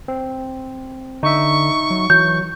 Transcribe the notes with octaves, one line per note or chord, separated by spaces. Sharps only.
C4
D3 D#4 E5 C#6
F#3
E3 F#3 G6